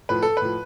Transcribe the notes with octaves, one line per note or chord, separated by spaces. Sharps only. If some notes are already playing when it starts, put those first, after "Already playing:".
A2 F3 B4
A4
B4
A2 F3